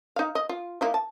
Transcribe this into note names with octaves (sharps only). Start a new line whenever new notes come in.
D#4 F5
D#5
F4
A#3 D#4 E4
A5